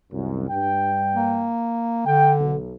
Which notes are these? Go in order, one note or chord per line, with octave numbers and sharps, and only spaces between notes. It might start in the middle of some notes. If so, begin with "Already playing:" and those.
C2 F#2
G2 G5
A#3
D3 G5
B1